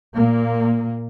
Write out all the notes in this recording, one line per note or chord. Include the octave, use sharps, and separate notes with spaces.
A#2 A#3